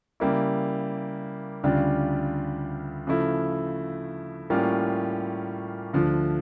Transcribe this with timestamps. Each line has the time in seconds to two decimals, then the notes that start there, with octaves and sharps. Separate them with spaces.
0.20 C#3 G3 A#3 E4
1.64 D2 C#3 G3 D4 F4
3.07 C#3 F3 A3 E4
4.50 A2 G3 A#3 C#4 F4
5.93 D2 D3 F3